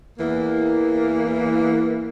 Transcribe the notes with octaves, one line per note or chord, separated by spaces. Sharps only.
E2 E3 A#3